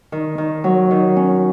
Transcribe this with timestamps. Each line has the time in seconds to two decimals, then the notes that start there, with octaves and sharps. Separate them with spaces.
0.12 D#3
0.38 D#3
0.64 F#3
0.91 D#3
1.17 C#4